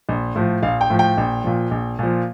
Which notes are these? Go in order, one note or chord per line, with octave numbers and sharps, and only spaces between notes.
A#1
A2 F3
A#1 F5
G5
A2 F3
G5
A#1
A#2 F3
A#1
A#2 F3